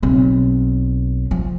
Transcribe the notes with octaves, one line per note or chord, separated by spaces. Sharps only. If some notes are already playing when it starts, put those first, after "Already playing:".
B1 C4
F3